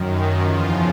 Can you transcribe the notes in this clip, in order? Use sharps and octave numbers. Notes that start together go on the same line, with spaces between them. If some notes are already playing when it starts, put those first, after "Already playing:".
Already playing: F#2 D#3
E2 C#3 F3 F4